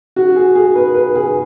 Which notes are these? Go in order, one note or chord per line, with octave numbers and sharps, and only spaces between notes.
F#4
G#4
G#4
B4
B4
G#4